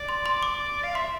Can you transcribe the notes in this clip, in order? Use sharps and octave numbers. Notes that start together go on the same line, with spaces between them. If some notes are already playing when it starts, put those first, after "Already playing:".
Already playing: D5
C6
C6
D6
F5
E5 C6